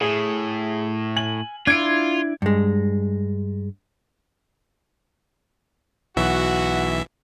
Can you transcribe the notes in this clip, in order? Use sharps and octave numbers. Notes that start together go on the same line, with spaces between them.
A2 G#4
G#5 F#7
D4 E4 F4 G#6 D7
G2 G#3
B1 E3 F#4 E5